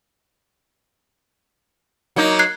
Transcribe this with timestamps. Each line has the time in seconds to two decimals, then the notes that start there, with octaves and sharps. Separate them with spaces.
2.16 F#3 A#3 D#4
2.39 F#6 G#6 C7